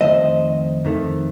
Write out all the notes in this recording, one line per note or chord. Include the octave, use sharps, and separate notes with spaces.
F2 D#3 A3 C5 D#5
F2 D#3 A3